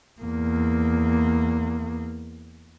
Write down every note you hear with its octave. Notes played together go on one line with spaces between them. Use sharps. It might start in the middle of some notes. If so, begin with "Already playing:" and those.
E2 A#3